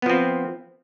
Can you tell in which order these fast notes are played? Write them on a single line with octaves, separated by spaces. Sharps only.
B3 F3 C4